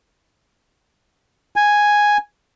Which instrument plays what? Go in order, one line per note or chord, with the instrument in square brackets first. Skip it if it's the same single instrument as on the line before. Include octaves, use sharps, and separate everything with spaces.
[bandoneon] G#5